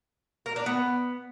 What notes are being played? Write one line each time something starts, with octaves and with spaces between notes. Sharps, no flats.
A#4
D4
B3